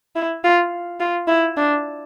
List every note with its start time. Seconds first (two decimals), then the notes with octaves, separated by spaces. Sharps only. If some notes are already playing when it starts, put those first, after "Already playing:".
0.16 E4
0.44 F4
1.00 F4
1.28 E4
1.57 D4